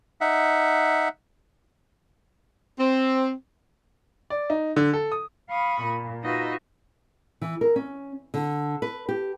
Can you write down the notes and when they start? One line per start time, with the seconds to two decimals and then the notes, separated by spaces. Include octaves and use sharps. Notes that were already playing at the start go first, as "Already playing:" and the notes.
0.21 D#4 E5 F#5
2.80 C4
4.30 D5
4.50 D#4
4.76 D3
4.93 A4
5.12 D#6
5.49 F5 B5 C#6 D#6
5.83 A#2
6.22 D#4 F4 F#4 B4 D#5 E5
7.41 E3
7.61 A#4
7.76 C#4
8.34 D3
8.82 B4
9.09 G4